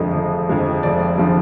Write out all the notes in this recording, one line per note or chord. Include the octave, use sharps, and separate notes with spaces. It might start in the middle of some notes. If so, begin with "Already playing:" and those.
Already playing: F1 F2 D3 F3 G#3 D#5
F1
F2 D3 F3 G#3
F1 D5
D3 F3 G#3